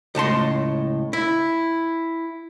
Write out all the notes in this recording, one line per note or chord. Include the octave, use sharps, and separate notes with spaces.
C#2 A2 A5 C6
E4